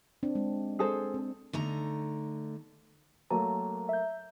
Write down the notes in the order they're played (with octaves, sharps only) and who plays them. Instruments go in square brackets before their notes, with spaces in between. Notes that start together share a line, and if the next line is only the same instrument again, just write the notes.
[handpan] C4 D4
G#3
[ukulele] G#4 A4 C5
[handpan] C4
[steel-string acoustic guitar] D3 A3 D#4 A#5
[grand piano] F#3 A3 A#3 [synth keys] A5 [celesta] A#5
[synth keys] E5 G6